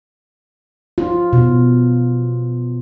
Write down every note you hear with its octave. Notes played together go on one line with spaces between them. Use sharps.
F4
B2